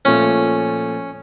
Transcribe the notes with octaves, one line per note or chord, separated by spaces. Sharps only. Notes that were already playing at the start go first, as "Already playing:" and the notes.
A#2 F3 A3 C#4